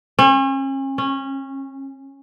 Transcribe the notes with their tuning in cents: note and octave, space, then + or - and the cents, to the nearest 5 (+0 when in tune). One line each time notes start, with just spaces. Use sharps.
C#4 -40
C#4 -15